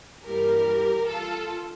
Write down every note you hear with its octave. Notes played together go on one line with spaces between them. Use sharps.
G2 E3 G3 A#3 G4 A#4
F4 A4